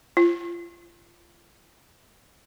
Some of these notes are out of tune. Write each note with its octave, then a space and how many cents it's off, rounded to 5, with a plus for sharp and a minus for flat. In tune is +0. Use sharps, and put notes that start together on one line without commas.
F4 -30